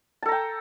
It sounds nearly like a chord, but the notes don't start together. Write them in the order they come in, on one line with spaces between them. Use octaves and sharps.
A5 A4 A#5 G5